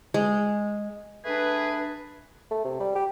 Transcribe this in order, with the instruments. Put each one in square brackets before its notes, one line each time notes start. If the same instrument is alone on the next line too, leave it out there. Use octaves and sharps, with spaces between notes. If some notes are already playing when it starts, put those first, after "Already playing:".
[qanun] G#3
[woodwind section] A3 D4 G#4 B4
[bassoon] A3
C3
G3
G4